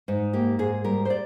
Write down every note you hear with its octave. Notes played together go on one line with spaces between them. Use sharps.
G#2 D#4
A#3 G4
G#2 G#4
G3 A#4
C5
D5